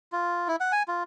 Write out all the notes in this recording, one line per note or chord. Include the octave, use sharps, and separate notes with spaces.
F4
E4
F#5
G#5
F4